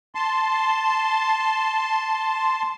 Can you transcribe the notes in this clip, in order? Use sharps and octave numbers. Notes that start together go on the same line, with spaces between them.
A5 C6